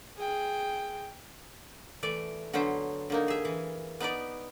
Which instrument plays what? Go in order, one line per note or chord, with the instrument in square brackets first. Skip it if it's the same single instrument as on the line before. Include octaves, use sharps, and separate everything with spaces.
[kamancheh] G#4 G5
[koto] E3 A3 D5
D3 F#3 B3 C#4 C5
D3 A#3 D#4
G#4 E5
E3
B3 D#4 B4 D5